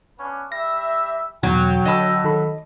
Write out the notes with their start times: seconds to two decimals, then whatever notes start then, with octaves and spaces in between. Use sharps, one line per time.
0.19 B3 C#4 D4
0.52 G3 E5 A#6
1.43 E2 B2 D3 F#3 G5
1.85 D3 D#5 A5 B5 E6
2.24 D#3 A4 B5